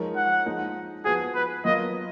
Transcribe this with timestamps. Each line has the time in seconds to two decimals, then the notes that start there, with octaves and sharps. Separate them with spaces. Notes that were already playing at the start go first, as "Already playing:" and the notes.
Already playing: F3 G#3 D#4 A#4 C#5
0.16 F#5
0.46 F3 G#3 D#4
1.05 F3 B3 F#4 G#4
1.35 B4
1.65 F#3 B3 F4 A#4 D#5